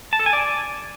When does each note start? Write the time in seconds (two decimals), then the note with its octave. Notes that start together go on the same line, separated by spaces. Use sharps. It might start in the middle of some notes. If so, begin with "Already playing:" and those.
0.13 A5
0.19 A4
0.26 G#5
0.33 D5